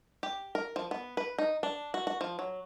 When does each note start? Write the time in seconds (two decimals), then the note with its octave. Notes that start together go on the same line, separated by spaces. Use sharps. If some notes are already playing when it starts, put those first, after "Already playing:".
0.23 G4
0.55 A#4
0.76 F3
0.91 B3
1.17 B4
1.38 D#4
1.63 D4
1.94 F#4
2.07 F#4
2.21 F3
2.39 F#3